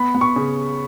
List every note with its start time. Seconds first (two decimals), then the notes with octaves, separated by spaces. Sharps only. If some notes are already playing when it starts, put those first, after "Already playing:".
Already playing: B3 B5
0.15 B3
0.21 C#6
0.36 C#3